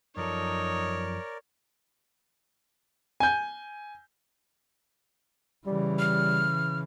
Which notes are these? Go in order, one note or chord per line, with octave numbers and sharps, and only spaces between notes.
F#2 F3 D#4 A4 A#4 C#5 D5
G#5 G6
C#3 E3 G3
F6